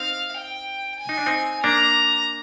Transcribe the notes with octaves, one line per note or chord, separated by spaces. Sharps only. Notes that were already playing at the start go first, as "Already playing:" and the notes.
Already playing: C4 D#4 F5
G5
G#5
D#4
D4
C4 D#4
A#3 D4 A#5